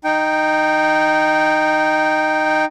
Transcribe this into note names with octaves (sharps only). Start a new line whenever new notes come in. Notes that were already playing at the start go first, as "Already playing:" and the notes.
D#4 G5